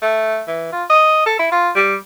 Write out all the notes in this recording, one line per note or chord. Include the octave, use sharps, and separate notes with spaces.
A3
E3
F4
D#5
A4
E4
F4
G3